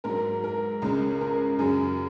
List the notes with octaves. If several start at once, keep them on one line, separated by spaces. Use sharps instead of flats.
G#2 F#3 A#4
A#4
C#2 C#3 G#3
A#4
F#2 C#3 F#3 G#4